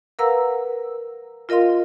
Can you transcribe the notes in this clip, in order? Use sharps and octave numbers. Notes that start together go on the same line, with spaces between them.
A#4 B4 F5 F#5 A#5 E6
F4 A#4 D#5 F5 C6